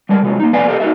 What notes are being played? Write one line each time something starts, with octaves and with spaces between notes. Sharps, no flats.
G3 G#3 A#4 F#5
C3 D#3 F#3 G#3 F4
A#3 D#4
F2 B3 D5 F5 G#5
G4 A4 A#4 D#5 F5
D#4 F#4 G#4 A#4 E5